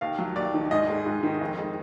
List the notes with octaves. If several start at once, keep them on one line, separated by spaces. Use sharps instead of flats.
D#2 F5
F#3
D#2 D5
D#3
G#2 D#5
G#3
G#2
D#3
F2
G#3